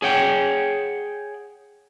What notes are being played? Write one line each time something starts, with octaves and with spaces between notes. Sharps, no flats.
G#4 C#5 F#5 G5